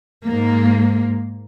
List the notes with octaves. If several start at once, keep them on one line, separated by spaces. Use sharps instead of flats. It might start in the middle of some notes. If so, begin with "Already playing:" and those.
G#2 A#3